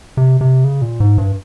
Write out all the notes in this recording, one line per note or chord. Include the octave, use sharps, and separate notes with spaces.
C3
C3
C#3
A#2
G#2
G2